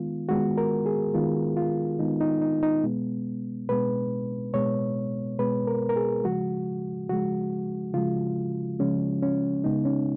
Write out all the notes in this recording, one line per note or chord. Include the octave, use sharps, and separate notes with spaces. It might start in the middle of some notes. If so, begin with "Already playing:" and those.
Already playing: D#3 G#3 B3 F4
D#3 G#3 B3 F#4
A#4
G#4
D#3 G#3 B3 F4
F4
D#3 G#3 B3 D#4
D#4
D#4
D#4
B2 G#3 B3
B2 G#3 B3 B4
B2 G#3 B3 C#5
B2 G#3 B3 B4
A#4
A#4
G#4
C#3 F3 G#3 F#4
C#3 F3 G#3 F#4
C#3 F3 G#3 F4
C#3 F3 G#3 C#4
C#4
C#3 G#3 B3 D#4
C#4